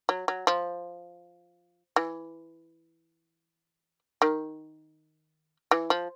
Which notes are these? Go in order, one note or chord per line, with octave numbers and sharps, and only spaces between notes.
F#3
F#3
F3
E3
D#3
E3
F3